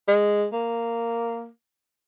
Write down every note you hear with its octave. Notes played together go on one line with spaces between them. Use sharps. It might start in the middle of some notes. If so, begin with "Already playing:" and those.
G#3
A#3